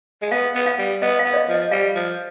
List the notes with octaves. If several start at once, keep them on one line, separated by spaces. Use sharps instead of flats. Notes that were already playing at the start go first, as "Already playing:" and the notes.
G#3
B3 F5
B3
F5
G3
B3 D#5
F5
B3
D5
D#5
F3
D#5
G3 F5
F3